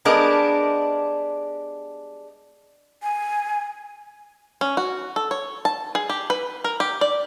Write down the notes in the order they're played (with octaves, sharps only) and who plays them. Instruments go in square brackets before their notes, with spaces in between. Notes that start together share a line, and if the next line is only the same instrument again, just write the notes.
[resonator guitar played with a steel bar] G3 G#3 B3 D4 A#4
[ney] G#5
[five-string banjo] C#4
F#4
A4
C#5
A5
G#4
G4
B4
A#4
G4
D5